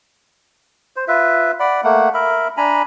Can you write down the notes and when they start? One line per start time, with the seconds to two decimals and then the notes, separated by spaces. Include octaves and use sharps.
0.96 C5
1.08 F4 B4 E5
1.60 D5 F#5 B5
1.84 A3 A#3 F#5
2.14 A#4 E5 B5
2.57 D4 G#5 A#5 B5